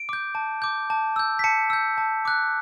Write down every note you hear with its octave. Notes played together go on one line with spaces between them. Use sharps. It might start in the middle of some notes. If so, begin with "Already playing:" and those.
Already playing: D7
D6 G6
A5
D6 G6
A5
E6 G6
B6
A5 C#7
E6 G6
A5
D6 F#6